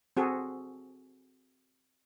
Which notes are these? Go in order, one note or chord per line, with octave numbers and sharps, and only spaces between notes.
C4 F#4 G#4 A4